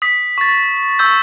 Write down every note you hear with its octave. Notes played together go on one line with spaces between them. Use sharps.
D#6 B6
C#6 A6
C#6 E6 G6